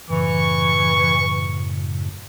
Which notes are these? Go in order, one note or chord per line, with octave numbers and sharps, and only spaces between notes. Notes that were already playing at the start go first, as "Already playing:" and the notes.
F#2 A2 C#3 E3 C#6